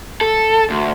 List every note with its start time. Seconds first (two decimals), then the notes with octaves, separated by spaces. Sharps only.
0.21 A4
0.70 D2